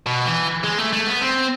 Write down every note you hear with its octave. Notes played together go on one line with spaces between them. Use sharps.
B2
E3
G#3
A3
A3
B3
C4